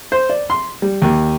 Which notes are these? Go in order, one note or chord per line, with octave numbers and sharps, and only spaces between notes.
C5
D5
C6
G3
D#2